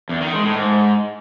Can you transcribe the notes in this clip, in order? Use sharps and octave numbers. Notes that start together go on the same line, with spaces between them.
E2
D#3
G#3
A2
G#2